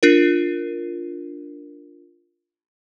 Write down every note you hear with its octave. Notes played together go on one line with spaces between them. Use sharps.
D4 F4 A#4